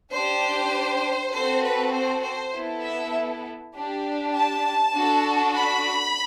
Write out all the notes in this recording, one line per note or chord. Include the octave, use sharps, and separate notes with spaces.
D4 G4 C5
C4 F#4 A4 C5
B4
C5
C5
B3 E4 A4
E5
D4 G4
A5
D4 F#4 A4
B5